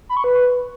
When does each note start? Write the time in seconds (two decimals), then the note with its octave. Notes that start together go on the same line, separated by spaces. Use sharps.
0.09 B5
0.17 C#6
0.24 B4